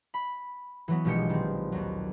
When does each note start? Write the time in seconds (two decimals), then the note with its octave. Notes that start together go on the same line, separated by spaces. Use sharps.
0.14 B5
0.88 E3 F#3 B3
1.05 A#1 B2 G#3 G4 C#7
1.30 D#3 C4
1.72 D#2 F#3